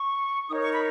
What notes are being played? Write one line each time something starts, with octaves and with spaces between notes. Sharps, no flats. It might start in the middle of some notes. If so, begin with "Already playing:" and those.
Already playing: C#6
D#4 A#4 C#5 D#6
C#6
B5